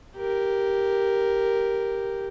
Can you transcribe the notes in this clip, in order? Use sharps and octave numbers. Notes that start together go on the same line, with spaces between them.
G4 A#4